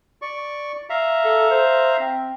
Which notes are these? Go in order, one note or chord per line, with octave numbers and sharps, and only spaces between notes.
D5 C#6
E5 F5 A#5
A4
C5
C4